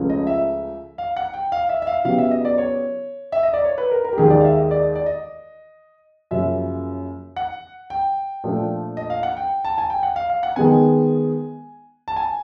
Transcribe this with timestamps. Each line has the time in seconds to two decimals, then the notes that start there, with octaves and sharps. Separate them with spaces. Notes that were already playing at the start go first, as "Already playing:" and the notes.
Already playing: C#2 C#3 F3 A3 C#4
0.10 D#5
0.27 E5
0.98 F5
1.17 F#5
1.34 G5
1.52 F5
1.69 E5
1.82 E5
1.87 F5
2.04 C#3 F#3 B3 E4 G4 F5
2.18 E5
2.31 D#5
2.45 D5
2.58 C#5
3.32 E5
3.43 D#5
3.54 D5
3.64 C#5
3.78 B4
3.91 A#4
4.04 A#4
4.13 G4
4.18 D#2 D#3 G#3 G#4
4.30 D5
4.40 F5
4.45 E5
4.58 D#5
4.71 D5
4.95 D5
5.06 D#5
6.31 F#2 C#3 F3 A#3 E5
7.36 F#5
7.90 G5
8.44 A#2 F3 A3 D4
8.97 D#5
9.10 F5
9.23 F#5
9.37 G5
9.65 A5
9.78 G#5
9.90 G5
10.03 F#5
10.16 F5
10.30 F5
10.43 F#5
10.56 D#3 G#3 B3 G#5
12.08 A5
12.16 G#5